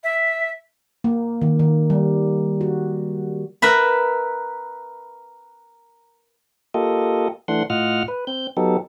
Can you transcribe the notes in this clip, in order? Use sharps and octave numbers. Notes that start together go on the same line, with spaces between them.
E5
A#3
D#3
D#3
G3
F#4
A#4 B4 E5 B5
A#3 F4 G4 A4 D#5
E3 A3 D4 F#5 C6
A2 F4 D#5 F#5 F6
B4
C4 G6
F#3 B3 D#4 G4 A4